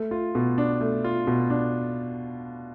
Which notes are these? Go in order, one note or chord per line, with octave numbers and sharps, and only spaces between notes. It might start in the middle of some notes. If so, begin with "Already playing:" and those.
Already playing: A3
F4
B2
D4
A3
F4
B2
D4